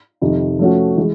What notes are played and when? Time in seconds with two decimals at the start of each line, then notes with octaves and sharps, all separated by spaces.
0.21 F2 C3 D#3
0.59 F3 A3 C#4 F#4
0.97 E3 G#3